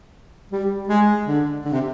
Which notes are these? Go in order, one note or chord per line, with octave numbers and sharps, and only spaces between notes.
G3
G#3
D3
D3
C3